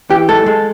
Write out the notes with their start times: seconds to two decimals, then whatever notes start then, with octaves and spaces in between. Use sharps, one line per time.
0.10 E3 G4
0.28 G#3 A4
0.46 G#3